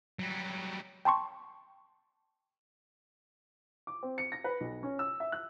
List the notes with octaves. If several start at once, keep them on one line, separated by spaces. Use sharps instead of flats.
F#3 G3
G5 A5 C6 C#6
D6
C4
C#7
A#6
B4
B1
C#4
E6
E5
F#6